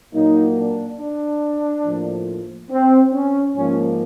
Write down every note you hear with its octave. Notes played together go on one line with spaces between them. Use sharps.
A#2 F#3 A#3 D#4
D4
D4
A2 F3 A#3
C4
C#4
G#2 F3 A#3 C#4